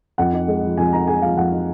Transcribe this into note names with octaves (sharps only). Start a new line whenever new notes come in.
F2 F#5
D#4
G#3
F3
F2 G#5
D#4 A#5
G#3 G#5
F3 F5
F2 F#5
D#4